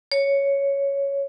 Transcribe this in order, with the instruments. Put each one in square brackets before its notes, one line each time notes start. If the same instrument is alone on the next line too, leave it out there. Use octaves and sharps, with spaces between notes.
[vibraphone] C#5